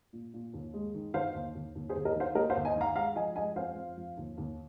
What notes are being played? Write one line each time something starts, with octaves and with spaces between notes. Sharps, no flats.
A#2
A#2
D#2
G#3
D#3
D#3 C5 F5
D#2
D#2
D#2
G#4 C5
D#2
A#4 D#5
D#3 C5 F5
A#3 A#4 D#5
C5 F5
D#2
D#5 G#5
D#3
F5 A#5
G#3 F5 A#5
F3 D#5 G#5
G#3 D#5 G#5
F2 C5 F5
F2
F2
D#2
D#2